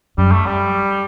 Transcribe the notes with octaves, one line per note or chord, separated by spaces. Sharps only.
F#2 G3
A3
G3